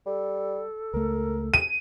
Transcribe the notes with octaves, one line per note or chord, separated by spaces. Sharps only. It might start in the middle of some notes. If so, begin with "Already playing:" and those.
G3 A4
C#2 A3 A#4
D#7